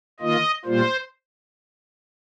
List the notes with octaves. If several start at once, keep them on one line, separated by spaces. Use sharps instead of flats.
D#3 A#3 F4 D#5
A#2 G3 A#3 F4 C5